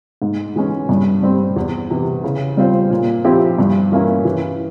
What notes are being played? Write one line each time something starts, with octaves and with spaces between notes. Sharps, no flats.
G#2
E3 G#3 C#4
G2
G3 C4
E2
C3 E3
C#3
G3 C4 F4 C5
A#2
F3 C4 E4 G4
G2
E3 A#3 C#4 E4
E3